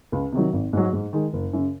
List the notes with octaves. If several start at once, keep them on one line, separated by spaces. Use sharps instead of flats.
C#2
C3 D#3 F#3
G#1
G#2 F#3
G#2
D#3 G#3
F#1
F#2 C#3